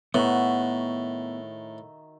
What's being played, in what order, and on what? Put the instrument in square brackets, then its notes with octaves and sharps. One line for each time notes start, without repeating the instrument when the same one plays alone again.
[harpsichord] A2 [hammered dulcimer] D#3 F#4 E5 [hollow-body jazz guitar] B3